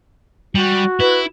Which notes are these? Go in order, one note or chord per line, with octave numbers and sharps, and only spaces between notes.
G3 F#4
E4 B4